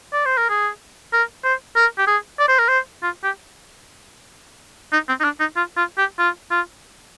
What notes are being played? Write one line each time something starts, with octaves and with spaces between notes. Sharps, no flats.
D5
C5
A#4
G#4
A#4
C5
A#4
G4
G#4
D5
C5
A#4
C5
F4
G4
D#4
C4
D#4
D4
D#4
F4
F4
G4
F4
F4